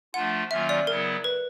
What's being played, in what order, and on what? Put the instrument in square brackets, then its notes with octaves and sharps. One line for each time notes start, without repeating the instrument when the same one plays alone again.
[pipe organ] F3 A3 D4 F4 [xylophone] F#5
[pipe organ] D#3 F#3 A#3 C#4 F4 [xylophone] E5
[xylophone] D5
[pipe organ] C#3 F#3 B3 E4 [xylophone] A#4
[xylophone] B4